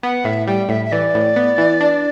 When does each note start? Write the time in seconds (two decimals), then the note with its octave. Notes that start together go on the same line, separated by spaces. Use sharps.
0.02 B3 F#5
0.24 A2 E5
0.47 G3 G5
0.69 A2 E5
0.85 E5
0.91 E3 D5
1.14 A2
1.36 B3
1.58 E3
1.81 D4